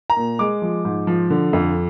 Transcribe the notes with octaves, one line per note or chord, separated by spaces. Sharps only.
A#5
A#2
G#3 D6
F3
G#2
F3
D3
F2